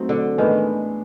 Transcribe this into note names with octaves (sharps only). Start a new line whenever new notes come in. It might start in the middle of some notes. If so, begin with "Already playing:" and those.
Already playing: F#3 A3 C4 D#4
D3
A2 D#3 E3 G#3 B3 D4